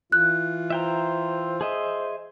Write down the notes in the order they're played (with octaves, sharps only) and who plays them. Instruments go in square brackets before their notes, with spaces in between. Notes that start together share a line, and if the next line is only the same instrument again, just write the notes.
[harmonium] E3 F4 [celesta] F#6
[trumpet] C5 [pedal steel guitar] E5 G5 A#5
[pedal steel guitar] G#4 D#5 E5